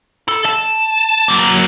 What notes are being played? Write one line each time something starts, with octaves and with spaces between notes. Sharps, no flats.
A4
A5
F#3 A#3